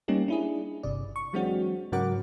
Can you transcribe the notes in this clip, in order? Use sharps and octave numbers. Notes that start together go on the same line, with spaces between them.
G3 A#3 C#4 D#4 G4
D4 E4 G#4
G1 C3 D5
C#6
E3 F#3 G#3 C4 D4 F#4
G#2 C#3 F#3 A#4 F#5 D6